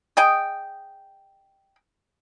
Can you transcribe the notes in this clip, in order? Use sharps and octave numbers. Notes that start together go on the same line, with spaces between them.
G#4 D#5 G5